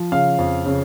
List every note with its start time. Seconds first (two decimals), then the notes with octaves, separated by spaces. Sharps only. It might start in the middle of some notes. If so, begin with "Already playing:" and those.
Already playing: F3
0.12 C#3 F5
0.39 F2
0.66 C#3